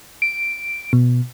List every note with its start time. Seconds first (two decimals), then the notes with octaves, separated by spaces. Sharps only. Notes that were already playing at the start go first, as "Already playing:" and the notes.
0.22 D7
0.93 B2